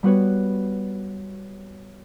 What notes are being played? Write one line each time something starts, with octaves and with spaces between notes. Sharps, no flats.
G3 B3 F#4 B4 C#5